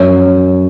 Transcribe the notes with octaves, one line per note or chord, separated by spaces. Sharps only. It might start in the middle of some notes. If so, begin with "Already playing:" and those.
Already playing: F#2 F#3 C#5